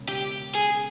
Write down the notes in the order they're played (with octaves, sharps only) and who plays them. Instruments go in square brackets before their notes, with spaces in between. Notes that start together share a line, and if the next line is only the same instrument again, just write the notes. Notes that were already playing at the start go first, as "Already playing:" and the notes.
Already playing: [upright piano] E1 C#3
[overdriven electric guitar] G4
G#4